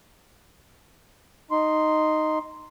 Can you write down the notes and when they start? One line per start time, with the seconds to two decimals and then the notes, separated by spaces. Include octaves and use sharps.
1.51 D#4 C6